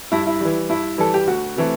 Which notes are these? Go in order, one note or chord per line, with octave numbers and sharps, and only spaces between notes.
G2 E4
E4
E3 G3
G2 E4
E3 G3 A4
G4
D2 F#4
C3 E3 A3